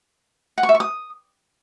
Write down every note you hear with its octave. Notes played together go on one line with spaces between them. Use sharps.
F#5
C#6
E5
C#6
D#6